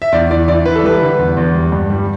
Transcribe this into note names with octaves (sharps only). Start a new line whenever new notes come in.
E5
E2 D5
E3 D5
E3 D5
E3 B4
A4
G3 B4
D3
E2
E2
G3
G2
G3